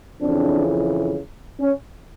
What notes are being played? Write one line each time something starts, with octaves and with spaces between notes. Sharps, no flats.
F2 C#3 E3 C4 D4
C#4